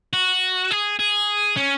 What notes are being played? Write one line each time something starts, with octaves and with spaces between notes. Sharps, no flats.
F#4
G#4
G#4
C#4